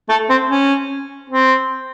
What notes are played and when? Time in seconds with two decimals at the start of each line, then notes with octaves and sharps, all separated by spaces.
0.09 A3
0.29 C4
0.49 C#4
1.30 C4